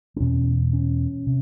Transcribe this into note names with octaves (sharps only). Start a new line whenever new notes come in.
C4
E2 B2 C#4
C#4
C3